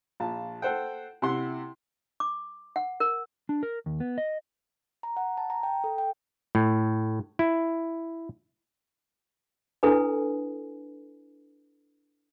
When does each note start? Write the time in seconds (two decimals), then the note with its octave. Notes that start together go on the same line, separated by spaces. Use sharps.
0.20 A#1 F4 A5
0.62 A4 C5 F#5 G5
1.22 C3 E4 F#5 C6
2.20 D6
2.76 F#5
3.00 A#4
3.49 D4
3.63 A#4
3.86 D#2
4.00 B3
4.18 D#5
5.03 A#5
5.17 F#5
5.37 A5
5.50 A#5
5.63 G5
5.84 A4
5.98 G5
6.55 A2
7.39 E4
9.83 D4 E4 A4 B4 G#5